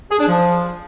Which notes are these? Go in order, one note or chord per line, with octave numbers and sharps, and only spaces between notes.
G#4
D4
F3